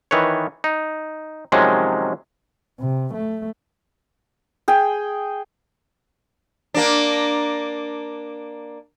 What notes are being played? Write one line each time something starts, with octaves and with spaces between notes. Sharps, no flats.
D#3 E3 B4 C#5
D#4
C3 D#3 F3 F#3 G#3 C#4
C3
A3
G#4 G5
A#3 D4